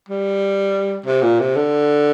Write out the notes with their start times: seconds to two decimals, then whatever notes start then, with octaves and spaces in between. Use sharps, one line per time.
0.09 G3
1.06 C3
1.22 A#2
1.40 C3
1.56 D3